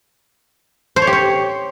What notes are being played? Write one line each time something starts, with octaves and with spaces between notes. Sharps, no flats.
C5
C#5
G4
C#5